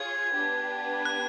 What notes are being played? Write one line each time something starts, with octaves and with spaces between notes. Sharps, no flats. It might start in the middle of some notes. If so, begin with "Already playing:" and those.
Already playing: F4 G#4 C#5 G#6
B3 D4 G4 B4
F#6